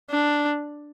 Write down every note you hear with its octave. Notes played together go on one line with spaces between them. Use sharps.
D4